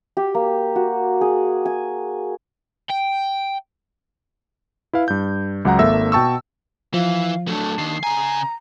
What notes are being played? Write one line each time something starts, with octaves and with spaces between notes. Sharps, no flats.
G4
A#3
F#4
G#4
G#5
G5
E4 B4 F5
G2 G6
C#2 F#3 F#5 A#5
G#1 A#3 A4 E5 E6 A#6
B2 G5 A5 C#6 E6
E3 F3 F5
F#3 A3 D4
D#2 D#3 C7
C#3 G#5 A#5